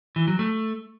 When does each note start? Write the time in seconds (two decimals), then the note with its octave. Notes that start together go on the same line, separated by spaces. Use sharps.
0.16 E3
0.28 F#3
0.39 A3